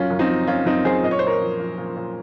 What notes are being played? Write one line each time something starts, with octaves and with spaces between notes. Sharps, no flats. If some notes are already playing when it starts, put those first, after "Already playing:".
Already playing: F#2 F#3 C#4 F4
F#2
C4 D#4
F3
F3 C#4 F4
F#2 C4 D#4
F#2 G#4 C5
A#2 D#5
C#5
C5
A#2 A#4 C#5
F3
F3
A#2
A#2